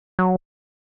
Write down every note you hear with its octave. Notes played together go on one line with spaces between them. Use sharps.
F#3